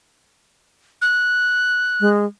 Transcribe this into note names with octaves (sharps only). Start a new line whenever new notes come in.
F#6
G#3